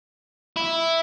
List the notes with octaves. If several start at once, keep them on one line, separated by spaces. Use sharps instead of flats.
E4